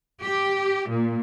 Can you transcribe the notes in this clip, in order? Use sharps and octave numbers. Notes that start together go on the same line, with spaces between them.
G4
A#2